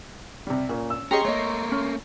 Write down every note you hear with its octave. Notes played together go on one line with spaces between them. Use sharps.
C3 G3
A#2 C#4
E6
C#4 G4 G#4 D#5 A#5 C6 C#6
A3 A#3 C#5 D#5
C#4